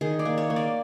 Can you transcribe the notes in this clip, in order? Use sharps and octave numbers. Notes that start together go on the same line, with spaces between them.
D#3 G#4
D5
A#3
C#5
A#3
D5